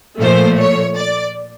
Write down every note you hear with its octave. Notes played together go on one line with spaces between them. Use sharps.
A#2 F3 A3 C5
C#5
D5